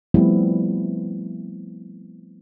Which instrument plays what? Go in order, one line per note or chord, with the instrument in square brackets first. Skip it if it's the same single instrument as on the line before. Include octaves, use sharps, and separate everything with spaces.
[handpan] F3 G3 A3 B3 C4 E4